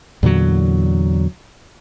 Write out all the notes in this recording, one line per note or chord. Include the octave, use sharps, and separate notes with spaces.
E2 A#2 D3 F#3